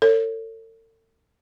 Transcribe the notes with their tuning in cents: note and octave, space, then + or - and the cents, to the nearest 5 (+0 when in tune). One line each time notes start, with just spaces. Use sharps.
A4 +40 C#5 +0